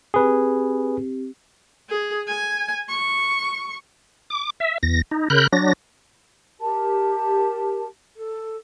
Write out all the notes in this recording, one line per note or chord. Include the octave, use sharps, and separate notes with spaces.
C4 G4 G#4 B4
G#4
G#5
C#6
D6
E5
E2 A#6
D#4
C#3 A#4 B5 F#6 G6
F#3 D4 A#6
G4 A#4 A5
A4